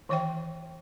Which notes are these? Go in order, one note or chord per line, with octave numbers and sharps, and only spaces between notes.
D#3 E3 C#5 E5 G5